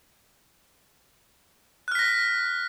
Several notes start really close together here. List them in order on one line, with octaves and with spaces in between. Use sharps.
F#6 F6 B6 A#6